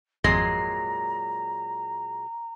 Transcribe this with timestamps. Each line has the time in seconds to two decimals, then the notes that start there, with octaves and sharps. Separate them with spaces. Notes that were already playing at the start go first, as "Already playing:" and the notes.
0.24 G#1 F2 A#2 F#3 G#3 A#5 A#6 C7